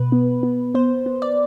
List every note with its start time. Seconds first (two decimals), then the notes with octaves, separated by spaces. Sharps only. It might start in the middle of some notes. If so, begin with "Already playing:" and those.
Already playing: B2 B4
0.12 B3
0.43 B3
0.74 B3 C5
1.06 B3
1.22 D5